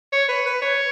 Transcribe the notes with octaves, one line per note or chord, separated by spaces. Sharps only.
C#5
B4
B4
C#5